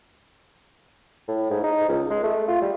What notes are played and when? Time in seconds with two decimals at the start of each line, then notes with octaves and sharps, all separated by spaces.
1.28 A2
1.51 G#2
1.64 D#4
1.89 C#2
2.10 G#3
2.23 A3
2.48 F4
2.62 G3